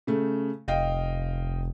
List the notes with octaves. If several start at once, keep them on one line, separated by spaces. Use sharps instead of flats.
C#3 A3
F1 D#5 F5 G5